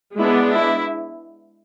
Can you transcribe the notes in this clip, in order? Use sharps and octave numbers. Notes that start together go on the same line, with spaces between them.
G#3 B3 D4 E4
E4